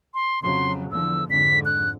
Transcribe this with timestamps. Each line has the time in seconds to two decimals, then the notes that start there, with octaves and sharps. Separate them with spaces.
0.14 C6
0.43 F2 C#3 F#3 C6
0.92 E2 D3 F3 E6
1.30 F2 G#2 D3 B6
1.65 F#6